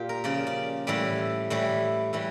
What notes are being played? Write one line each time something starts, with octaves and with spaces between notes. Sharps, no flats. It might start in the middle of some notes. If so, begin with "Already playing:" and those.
Already playing: A#2 F4 G4
A#4
C#3 F3 D5
D5
A2 E3 G3 D5
A2 E3 G3
A2 E3 G3